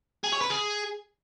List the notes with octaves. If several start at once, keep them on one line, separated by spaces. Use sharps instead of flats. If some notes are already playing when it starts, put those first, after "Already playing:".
G#4
C#5
B4
G#4